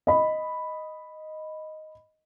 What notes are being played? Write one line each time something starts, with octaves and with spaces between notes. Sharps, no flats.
D#5 B5